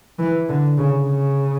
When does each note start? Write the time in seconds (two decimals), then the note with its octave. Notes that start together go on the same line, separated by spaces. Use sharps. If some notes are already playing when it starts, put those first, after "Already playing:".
0.19 E3
0.49 D3
0.78 C#3
1.07 C#3